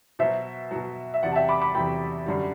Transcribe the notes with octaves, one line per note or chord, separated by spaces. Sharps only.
B2 F#3 C5 E5
B2 F#3
E5
E2 C3 F#3 D5 F#5
A5
E5 G5
B5 D6
B5 D6
E2 C3 F#3 G5 B5
F#2 D3 G3